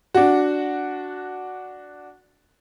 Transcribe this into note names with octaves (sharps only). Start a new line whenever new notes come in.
D4 F#4